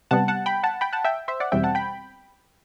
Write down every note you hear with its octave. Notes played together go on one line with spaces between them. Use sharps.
C3 G3 B3 F#5 A5
F#5 A5
G5 B5
F#5 A5
G5 B5
F#5 A5
E5 G5
C5 E5
D5 F#5
E2 B2 G3 C4 E5 G5
F#5 A5
G5 B5